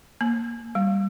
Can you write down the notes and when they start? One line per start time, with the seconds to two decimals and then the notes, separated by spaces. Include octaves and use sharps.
0.21 A#3
0.75 G3